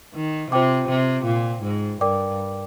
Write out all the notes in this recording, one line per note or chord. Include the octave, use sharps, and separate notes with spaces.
D#3
C3 F4 C5 G5 D6
C3
A#2
G#2
G2 A#4 D5 G5 D6